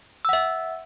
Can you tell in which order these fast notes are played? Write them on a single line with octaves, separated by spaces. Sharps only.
E6 F#5 E5